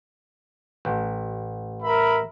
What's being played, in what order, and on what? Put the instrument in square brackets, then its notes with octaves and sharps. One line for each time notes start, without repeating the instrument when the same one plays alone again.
[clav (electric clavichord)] A1
[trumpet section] A#4 E5 B5